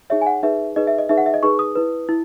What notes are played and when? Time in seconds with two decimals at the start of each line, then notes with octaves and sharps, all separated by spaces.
0.10 D#4 G#4 C#5 E5
0.21 G#5
0.27 F#5
0.43 D#4 G#4 B4 E5
0.76 D#4 G#4 B4 D#5
0.87 E5
0.98 D#5
1.09 D#4 G#4 B4 E5
1.18 F#5
1.26 E5
1.34 D#5
1.43 D#4 G#4 B4 C#6
1.59 D#6
1.75 E4 B4
2.09 E4